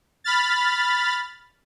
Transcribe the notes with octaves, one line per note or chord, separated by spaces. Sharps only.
B5 F6 A6